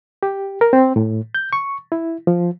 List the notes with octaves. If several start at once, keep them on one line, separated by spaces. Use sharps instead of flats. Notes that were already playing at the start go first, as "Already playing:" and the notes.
G4
A#4
C4
A2
G6
C#6
E4
F3